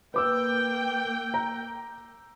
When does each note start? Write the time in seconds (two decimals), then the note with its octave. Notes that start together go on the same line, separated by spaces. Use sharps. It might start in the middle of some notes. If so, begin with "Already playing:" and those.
0.14 A#3 B4 G5 D6 E6
1.34 A#5